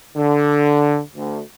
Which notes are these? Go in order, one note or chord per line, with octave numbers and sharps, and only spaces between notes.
D3
D2